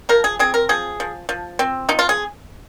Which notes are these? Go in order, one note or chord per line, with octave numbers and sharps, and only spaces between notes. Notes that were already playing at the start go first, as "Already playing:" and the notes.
F3 A#4
G#4
C4 G#4
A#4
F3 G#4
F3
F3
C4
F3 D#4
F4
G#4